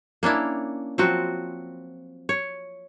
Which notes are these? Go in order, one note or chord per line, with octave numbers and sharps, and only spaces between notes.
A#3 C#4 D4 E4
F3 F#3 C4 F#4
C#5